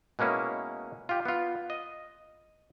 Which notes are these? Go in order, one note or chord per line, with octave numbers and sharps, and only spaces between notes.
B2 G#3 A#3 C#4 E4
F4 G4
B3 F4
D#5